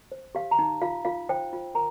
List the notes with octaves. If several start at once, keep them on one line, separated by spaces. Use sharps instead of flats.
C5
G4 F5
A#5
D#4
F4 F5
F4 F5
C5 G5
F4
A#4 A#5